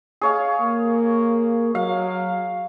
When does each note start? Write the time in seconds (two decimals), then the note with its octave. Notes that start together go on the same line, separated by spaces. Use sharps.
0.21 G#4 C#5 F5
0.61 A#3
1.75 F#3 F5